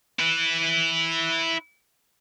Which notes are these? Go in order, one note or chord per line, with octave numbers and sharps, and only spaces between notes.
E4 B4